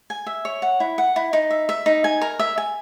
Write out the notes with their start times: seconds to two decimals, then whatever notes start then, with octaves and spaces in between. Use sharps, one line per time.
0.10 G#5
0.27 E5
0.45 C#5
0.62 F#5
0.80 E4
0.98 F#5
1.16 E4
1.33 D#4
1.51 E5
1.69 E5
1.86 D#4
2.04 G#5
2.22 A#4
2.39 E5
2.58 G#5